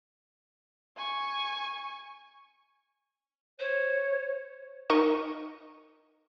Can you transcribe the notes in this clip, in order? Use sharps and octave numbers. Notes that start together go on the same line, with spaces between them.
G#5 C#6
C5 C#5
D#4 A#4 D#5 C#6 D#7